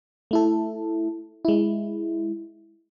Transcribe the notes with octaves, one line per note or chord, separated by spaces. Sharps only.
A3 E4 A4
G#3 E4